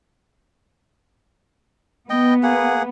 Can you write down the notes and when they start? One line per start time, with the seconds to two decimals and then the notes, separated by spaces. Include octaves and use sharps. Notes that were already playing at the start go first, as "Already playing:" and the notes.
2.10 B3 D#5 G5
2.43 A#3 G#4 F#5